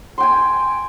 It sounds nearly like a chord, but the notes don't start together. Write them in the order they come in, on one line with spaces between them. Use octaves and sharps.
C6 G5 G#5